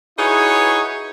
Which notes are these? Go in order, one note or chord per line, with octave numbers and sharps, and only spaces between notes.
D#4 E4 F#4 G#4 B4 C#5